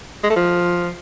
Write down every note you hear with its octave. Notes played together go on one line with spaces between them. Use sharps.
G#3
A3
F3